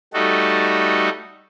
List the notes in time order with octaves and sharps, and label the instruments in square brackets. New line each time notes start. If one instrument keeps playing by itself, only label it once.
[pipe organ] G3 A3 D#4 F#4 A4